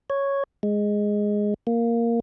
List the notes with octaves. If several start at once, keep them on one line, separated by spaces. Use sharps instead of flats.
C#5
G#3
A#3